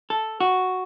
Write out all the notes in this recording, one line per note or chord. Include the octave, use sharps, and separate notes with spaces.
A4
F#4